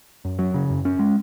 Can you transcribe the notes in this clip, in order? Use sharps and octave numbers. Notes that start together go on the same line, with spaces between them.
F#2
F#3
C#3
F#2
C#4
G#3